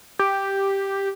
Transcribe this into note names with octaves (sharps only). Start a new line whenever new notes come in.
G4